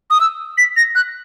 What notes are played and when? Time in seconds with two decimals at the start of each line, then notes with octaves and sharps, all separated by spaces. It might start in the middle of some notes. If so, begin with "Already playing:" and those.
0.10 D#6
0.20 E6
0.58 B6
0.77 A#6
0.95 F#6